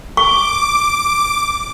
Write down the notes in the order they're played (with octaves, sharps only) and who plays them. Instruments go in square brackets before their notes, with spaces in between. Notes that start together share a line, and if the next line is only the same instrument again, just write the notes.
[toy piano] C#6 [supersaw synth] D6